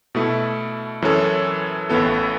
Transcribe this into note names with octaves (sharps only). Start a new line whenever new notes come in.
B2 A3 E4
F#2 E3 C#4 A4 C#5
A1 A2 E3 B3 A4